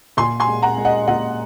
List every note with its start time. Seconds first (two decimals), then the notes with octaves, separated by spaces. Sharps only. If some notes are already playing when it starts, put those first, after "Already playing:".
0.17 A#2 G#5 C6
0.40 G#5 C6
0.48 G#3
0.62 F#5 A#5
0.78 G#3
0.85 D#5 F#5
1.07 A#2 D#5 F#5